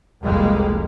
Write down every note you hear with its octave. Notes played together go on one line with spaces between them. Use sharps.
F1 C2 F2 G3 G#3 A#3